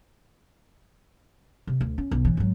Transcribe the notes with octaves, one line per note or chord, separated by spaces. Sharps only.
C3
D2
C#4
B1
A1 E3
G#1 F#3